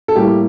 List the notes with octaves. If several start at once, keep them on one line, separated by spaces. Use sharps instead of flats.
A4
A2 G3 A#3 G4